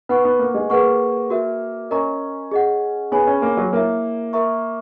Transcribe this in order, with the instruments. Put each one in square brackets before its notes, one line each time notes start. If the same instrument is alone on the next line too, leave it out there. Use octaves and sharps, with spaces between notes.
[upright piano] B3 [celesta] B4 F#5 C#6
[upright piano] B3
A#3
G#3
[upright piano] A#3 [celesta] G#4 B4 F#5 C#6
[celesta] F#4 A#4 E5
[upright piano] C#4 [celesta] A#4 D#5 A#5 C#6
[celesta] G#4 D#5 F#5
[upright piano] B3 [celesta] G#4 C#5 G#5 B5
[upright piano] C#4
A#3
F#3
[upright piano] A#3 [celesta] E4 A#4 C#5 E5 A#5
[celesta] A#4 E5 A#5 C#6